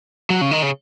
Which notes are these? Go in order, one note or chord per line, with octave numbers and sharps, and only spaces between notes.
F#3
C#3
D#3
C#3